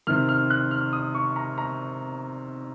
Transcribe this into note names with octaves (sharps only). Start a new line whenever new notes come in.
C3 D#3 F6
F6
F#6
F6
D#6
C#6
A#5
A#5